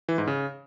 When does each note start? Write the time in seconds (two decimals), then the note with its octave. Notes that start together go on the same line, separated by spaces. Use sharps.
0.09 E3
0.18 G#2
0.27 C#3